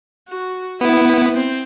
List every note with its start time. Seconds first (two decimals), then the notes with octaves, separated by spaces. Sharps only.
0.29 F#4
0.81 B3 E4
1.33 C4